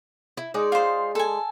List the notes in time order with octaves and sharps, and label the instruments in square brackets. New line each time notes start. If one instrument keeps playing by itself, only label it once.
[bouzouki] E4
G#3 D#4 D5
[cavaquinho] F4 C5
A4 G#5